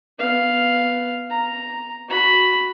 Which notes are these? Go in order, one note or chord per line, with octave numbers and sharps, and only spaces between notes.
B3 F5
A#5
F#4 B5